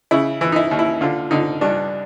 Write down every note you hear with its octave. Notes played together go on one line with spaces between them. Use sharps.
C#3 E4
E3
D#4
E4
D#2
E4
D3 F4
D3 D#4
G2 D4